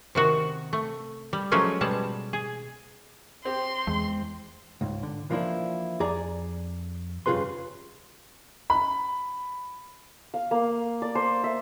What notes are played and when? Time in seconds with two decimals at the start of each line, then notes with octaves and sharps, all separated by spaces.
0.15 C3 D#3 F#4
0.73 A3
1.33 G3
1.51 F3 F#3 G#3 A3 C#4 F4
1.81 B2 G3 G#3 A5
2.33 G#4
3.45 C4 G4 C6
3.87 E2 G#3
4.81 C#2 G#2
5.03 D3
5.30 E3 F3 A#3 D4 E4
6.00 F2 G#4 D5 A#5
7.26 G2 C#3 F4 G#4 B4 C6
8.70 B5
10.34 F5
10.51 A#3
11.02 D5
11.15 C5
11.44 E5